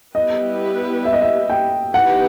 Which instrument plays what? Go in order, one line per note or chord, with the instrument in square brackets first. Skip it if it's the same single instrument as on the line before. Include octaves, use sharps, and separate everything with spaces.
[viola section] G3 B3 E4 G4 B4 [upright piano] D#5
[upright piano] E5
D#5
E5
G5
[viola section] E3 B3 D#4 G4 B4 [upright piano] F#5